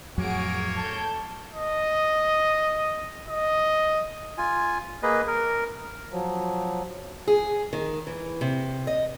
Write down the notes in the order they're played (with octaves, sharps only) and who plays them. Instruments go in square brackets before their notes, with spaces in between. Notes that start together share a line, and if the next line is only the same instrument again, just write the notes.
[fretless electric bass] F2 A2 F#3 [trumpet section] A#3 C#5 [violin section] F#4 G#4 D7
[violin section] A4 G6 [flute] A5
[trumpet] D#5
D#5
[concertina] F4 G#5
A#3 G#4 B4 D#5
A#4
[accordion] F3 F#3
[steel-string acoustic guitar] G#4
D#3
E3
C3
D#5